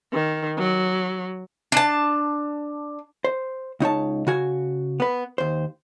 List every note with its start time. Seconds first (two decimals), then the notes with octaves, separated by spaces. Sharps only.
0.14 D#3
0.59 F#3
1.72 D4 A5
3.24 C5
3.80 C#2 D#4 C#5 A5
4.27 C#3 F#4 G#5
5.00 B3 B4
5.38 D#2 C5